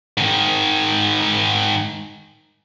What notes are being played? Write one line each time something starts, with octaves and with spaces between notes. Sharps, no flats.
G#2 D#3